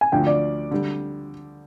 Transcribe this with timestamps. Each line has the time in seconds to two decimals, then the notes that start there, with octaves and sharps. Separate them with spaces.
0.01 G#5
0.12 D2 D3 F3 G5
0.27 D5
0.71 D3 G3